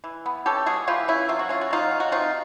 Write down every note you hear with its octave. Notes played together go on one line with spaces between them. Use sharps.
E3
B3
C#4 G4 A4
G#3 F#4 G#4
E3 F4 G4
C#4 E4
F#3 F4
F#4
C#4 F4
F#4
F#3 D#4 F4
C#4
F#4
C3 D#4 F4